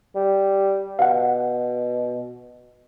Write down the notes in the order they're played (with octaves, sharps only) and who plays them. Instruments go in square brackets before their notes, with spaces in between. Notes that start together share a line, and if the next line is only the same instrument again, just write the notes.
[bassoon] G3
[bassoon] B2 [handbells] F5 F#5